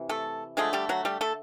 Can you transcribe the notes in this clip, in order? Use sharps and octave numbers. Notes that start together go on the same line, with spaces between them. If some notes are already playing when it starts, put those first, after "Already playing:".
Already playing: C3 E3
A3 A4
D3 F3 G#3 A3 G#4
G3 G4
F#3 F#4
G3 G4
A3 A4